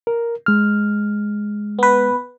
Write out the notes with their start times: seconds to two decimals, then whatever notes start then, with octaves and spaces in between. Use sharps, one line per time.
0.07 A#4
0.46 G#3 F6
1.79 B3 B4